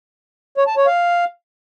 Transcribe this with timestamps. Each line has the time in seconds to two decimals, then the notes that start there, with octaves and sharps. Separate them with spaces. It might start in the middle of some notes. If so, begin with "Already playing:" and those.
0.57 C#5
0.67 A5
0.77 C#5
0.87 F5